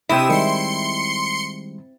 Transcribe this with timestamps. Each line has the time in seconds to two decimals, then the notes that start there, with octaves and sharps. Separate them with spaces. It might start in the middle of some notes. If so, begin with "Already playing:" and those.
0.09 C3 C4 E4 D#5 D#6 E7
0.29 D#3 G3 G#3 C6 C#7